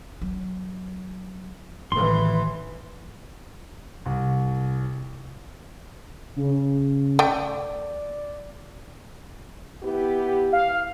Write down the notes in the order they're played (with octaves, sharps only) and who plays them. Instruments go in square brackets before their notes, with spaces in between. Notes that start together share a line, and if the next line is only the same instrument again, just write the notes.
[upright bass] F#3
[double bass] A1 E3 [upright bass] D#3 [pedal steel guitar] C6
[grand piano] C2
[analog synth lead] C#3
[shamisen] A3 G5 [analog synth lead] D5
[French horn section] B3 E4 G4
[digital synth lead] F5